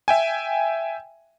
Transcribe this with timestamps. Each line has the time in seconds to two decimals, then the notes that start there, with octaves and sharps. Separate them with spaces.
0.08 E5 G5 G#5